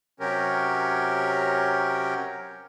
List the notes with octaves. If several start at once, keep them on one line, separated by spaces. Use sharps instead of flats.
C3 F#3 C#4 G4 A#4